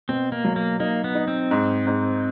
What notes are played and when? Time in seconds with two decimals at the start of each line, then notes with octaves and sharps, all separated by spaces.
0.09 B2 C4
0.32 A#3
0.44 F#3
0.56 A#3
0.80 A#3 D#4
1.04 B3
1.15 D#4
1.28 C4
1.51 G#2
1.87 G#2